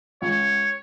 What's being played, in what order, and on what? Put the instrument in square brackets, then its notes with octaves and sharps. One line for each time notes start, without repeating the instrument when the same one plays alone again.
[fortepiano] C#2 [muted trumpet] C#5